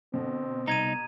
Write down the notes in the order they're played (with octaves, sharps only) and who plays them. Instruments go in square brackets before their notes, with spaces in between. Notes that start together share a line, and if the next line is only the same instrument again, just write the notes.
[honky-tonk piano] B2 D3 [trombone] C4
[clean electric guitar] C2 D#4 [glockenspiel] A#5 G#6 D#7